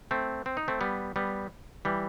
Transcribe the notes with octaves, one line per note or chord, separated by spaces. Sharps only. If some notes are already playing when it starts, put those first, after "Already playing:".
A3 C4
C4
D#4
A3 C4
G3 B3
G3 B3
E3 G3